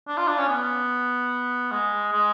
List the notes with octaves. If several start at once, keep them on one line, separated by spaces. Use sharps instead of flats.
D4
F4
D4
C#4
B3
G#3
G#3